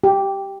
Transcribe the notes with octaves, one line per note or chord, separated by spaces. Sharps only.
G4